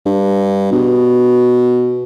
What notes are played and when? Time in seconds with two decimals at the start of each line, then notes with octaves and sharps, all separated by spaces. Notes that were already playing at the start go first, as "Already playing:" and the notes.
0.06 G2
0.72 B2